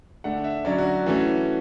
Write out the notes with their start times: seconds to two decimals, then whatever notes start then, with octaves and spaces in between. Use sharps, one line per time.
0.24 D3 A3 D4 F#5
0.44 E5
0.65 D3 F#3 C#4 D5
0.78 F#4
1.06 E3 A3 C#4 F#4